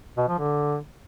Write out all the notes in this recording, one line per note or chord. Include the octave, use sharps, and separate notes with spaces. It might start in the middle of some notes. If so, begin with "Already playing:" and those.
B2
F3
D3